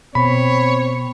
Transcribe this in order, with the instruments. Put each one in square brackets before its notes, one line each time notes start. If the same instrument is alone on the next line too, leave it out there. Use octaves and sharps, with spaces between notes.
[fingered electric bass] B2 [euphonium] C4 [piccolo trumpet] C#5 [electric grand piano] B5